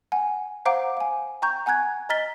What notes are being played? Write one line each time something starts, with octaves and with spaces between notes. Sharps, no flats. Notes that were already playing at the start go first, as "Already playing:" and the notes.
F#5 G#5
C5 F5 F#5 A#5 D6 D7
F5 G#5
G5 A#5 C#6 G6
F#5 G#5 A#5 F#6 G#6
D#5 A#5 F6 A6 B6 G7